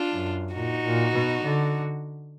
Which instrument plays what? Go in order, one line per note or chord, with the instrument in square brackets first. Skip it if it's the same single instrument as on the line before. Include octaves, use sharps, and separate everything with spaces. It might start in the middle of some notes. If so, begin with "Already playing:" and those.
Already playing: [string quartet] D4 F4
[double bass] F#2
[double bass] A#2 [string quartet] D#4 F#4
[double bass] A#2
B2
D3